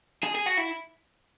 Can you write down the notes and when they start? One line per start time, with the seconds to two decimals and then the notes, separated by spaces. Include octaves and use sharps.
0.24 G#4
0.35 G#4
0.46 F#4
0.58 E4